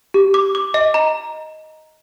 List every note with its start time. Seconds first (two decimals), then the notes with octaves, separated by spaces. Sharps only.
0.14 G4
0.34 D6
0.55 D6
0.74 D#5
0.94 A#5